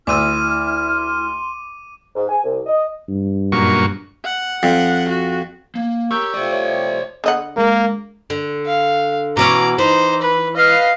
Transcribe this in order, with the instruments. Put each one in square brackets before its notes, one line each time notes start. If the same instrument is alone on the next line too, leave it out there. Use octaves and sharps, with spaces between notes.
[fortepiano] D2 E6 [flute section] E4 F6 [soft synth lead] C6 [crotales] D6 D#7
[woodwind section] G#2
G#5
C2
D#5
[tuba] G2
[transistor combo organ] F#2 A#2 C#6
[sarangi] F#5
[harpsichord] F2
[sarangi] F#4
[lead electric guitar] A#3
[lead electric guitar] G4 [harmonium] A#4 C#5 [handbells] C#6 E6 G6
[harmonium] F3 A3 G4 [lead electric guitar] C5 D5
[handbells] C#5
[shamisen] D3 D#5 F#5
[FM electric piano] G#3 A#4 [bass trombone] A#3
[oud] D3
[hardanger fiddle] F5
[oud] B2 E3 C#4 [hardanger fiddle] A#5 D6
[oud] E3 [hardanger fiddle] D#4 C5
[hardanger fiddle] B4
[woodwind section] B4 F5 [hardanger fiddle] D#5